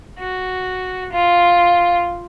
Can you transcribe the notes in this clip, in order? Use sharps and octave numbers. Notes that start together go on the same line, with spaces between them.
F#4
F4